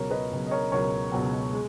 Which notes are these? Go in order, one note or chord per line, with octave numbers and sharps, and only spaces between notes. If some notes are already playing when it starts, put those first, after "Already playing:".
Already playing: C#2 B2 F#3 A#4 C#5
B4 D#5
C#2 B2 F#3
D#5
A#4 C#5
C#2 B2 F#3 A#4 C#5
C#2 B2 F#3
G#3